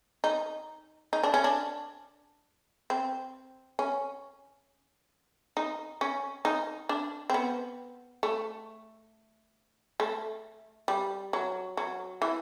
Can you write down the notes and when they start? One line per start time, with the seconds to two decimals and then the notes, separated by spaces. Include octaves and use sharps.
0.24 D#4
1.13 D#4
1.23 D4
1.34 C#4
1.44 D4
2.90 C4
3.79 C#4
5.57 D#4
6.01 C#4
6.45 D#4
6.89 D4
7.30 C4
7.34 B3
8.23 A3
10.00 A3
10.88 G3
11.33 F#3
11.77 F#3
12.22 E3